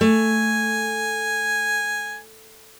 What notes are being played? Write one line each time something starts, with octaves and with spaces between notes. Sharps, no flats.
A3 G#5